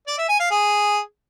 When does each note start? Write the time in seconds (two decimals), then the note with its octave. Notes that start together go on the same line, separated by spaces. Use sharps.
0.07 D5
0.18 E5
0.29 G#5
0.40 F5
0.51 G#4